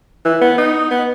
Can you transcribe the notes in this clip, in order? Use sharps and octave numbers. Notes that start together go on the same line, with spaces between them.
E3
B3
D#4
B3